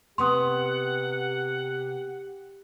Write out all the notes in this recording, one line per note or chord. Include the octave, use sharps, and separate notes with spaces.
C3 B3 G4 F#5 C6 D#6